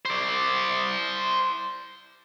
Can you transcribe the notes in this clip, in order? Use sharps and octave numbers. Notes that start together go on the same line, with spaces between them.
C5 D5